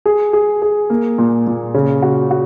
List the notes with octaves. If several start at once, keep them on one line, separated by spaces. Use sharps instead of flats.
G#4
G#4
G#4
A#3
A#2
A#2
C#3
F#4
F#4